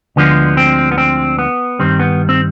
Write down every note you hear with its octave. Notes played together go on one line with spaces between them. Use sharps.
D2 D3 F3 G#3 B3
C4
B3
C4
B3
G2 D#3 G3 C4
B3
C4